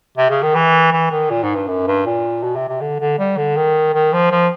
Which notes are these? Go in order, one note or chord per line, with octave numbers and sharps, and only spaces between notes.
C3
C#3
D#3
E3
E3
D#3
A#2
G#2
G2
F#2
G2
A#2
B2
C3
C3
D3
D3
G3
D3
D#3
D#3
F3
F3